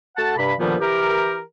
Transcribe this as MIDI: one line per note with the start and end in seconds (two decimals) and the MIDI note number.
0.17 0.33 57
0.17 0.33 66
0.17 0.33 78
0.17 0.33 81
0.37 0.53 43
0.37 0.53 48
0.37 0.53 83
0.59 0.75 46
0.59 0.75 50
0.59 0.75 51
0.59 0.75 53
0.59 0.75 55
0.59 0.75 59
0.81 1.40 52
0.81 1.40 67
0.81 1.40 70